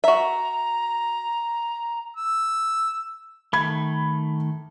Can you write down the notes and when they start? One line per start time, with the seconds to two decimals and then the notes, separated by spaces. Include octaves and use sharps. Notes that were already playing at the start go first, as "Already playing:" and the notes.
0.04 F#4 E5 A#5
2.17 E6
3.53 D#3 A3 B5 G#6